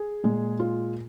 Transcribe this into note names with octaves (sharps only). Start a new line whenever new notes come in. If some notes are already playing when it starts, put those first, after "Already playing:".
Already playing: G#4
A#2 G#3
F4